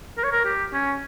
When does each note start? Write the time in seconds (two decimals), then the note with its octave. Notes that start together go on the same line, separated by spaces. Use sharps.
0.17 A#4
0.24 C#5
0.32 A#4
0.45 G4
0.73 C#4